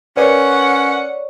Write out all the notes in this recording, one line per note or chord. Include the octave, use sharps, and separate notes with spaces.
C#4 A#4 B4 C#5 D5 F#5